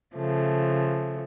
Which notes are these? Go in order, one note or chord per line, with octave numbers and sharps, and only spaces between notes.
C#3 F3 A3